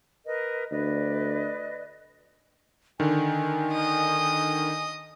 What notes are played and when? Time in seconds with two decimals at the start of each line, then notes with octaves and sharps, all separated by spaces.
0.25 A#4 B4 D#5
0.71 D2 B4 D5 D#5
3.00 D3 D#3 G#5
3.72 D#5 D#6